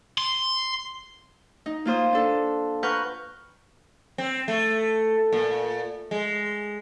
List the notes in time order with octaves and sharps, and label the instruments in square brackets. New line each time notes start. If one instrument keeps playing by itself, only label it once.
[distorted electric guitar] C6
[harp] D#4
A#3 F4 C5 D#6
D4 A4
B4 F#5 A#5 C#6 F6 G6
[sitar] C4
A3
A#2
G#3